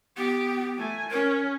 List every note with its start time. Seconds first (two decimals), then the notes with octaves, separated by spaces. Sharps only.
0.17 B3 G4
0.78 A3 G#5
1.11 C#4 A#4